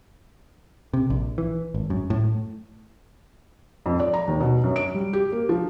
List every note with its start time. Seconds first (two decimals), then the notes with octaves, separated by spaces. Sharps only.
0.94 C3
1.10 A#1
1.38 E3
1.74 G#1
1.90 F#2
2.10 A2
3.86 F2
4.00 D5
4.14 A#5
4.27 D#2
4.40 B2
4.64 F#2
4.76 D7
4.94 G3
5.13 G4
5.32 A#3
5.49 F3